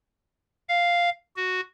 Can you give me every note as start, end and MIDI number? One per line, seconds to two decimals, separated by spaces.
0.69 1.10 77
1.36 1.61 66